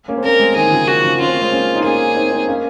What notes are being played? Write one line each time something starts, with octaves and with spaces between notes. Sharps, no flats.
A#3 C#4
C4
A#3 C#4 A#4
G#3 C4
D#3 G#4
D#3
C#3 F3
F#4
C#3 F3
C#4 F4
C4
A#3
G#3 C4
A#3 C#4
D#4
A#3 C#4 G#4
C4 D#4
C4 D#4
A#3 C#4